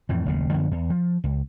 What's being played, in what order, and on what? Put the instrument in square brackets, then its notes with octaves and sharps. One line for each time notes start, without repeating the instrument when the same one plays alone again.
[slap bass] F2 A2 E3
F#1 D#2 C#3
F#2 D3 F3 B3
E2
F3
C#2